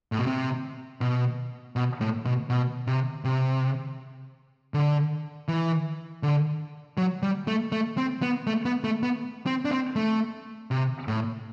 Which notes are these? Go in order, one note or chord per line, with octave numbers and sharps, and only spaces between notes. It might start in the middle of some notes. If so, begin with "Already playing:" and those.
A2
B2
C3
B2
B2
A2
B2
B2
C3
C3
D3
E3
D3
F#3
G3
A3
A3
C4
B3
A3
B3
A3
B3
C4
D4
C4
A3
C3
A2